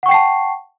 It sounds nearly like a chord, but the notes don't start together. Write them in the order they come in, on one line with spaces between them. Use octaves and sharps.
F#5 C#6 G5 C7 A5